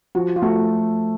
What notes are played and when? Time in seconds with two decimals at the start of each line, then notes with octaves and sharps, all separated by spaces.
0.15 F3 F#4
0.36 F4
0.42 A3 F#4